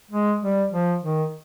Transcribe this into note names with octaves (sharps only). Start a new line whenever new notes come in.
G#3
G3
F3
D#3